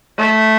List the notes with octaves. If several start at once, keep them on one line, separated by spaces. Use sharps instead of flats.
A3